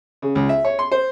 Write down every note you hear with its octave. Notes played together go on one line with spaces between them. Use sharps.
C#3
C#2
E5
C#5
C6
C5